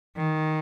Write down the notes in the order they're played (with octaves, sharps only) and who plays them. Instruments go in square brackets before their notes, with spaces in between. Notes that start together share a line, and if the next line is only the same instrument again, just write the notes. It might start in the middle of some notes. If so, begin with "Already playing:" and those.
[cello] D#3